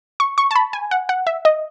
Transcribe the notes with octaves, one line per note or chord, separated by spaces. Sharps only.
C#6
C#6
A5
B5
G#5
F#5
F#5
E5
D#5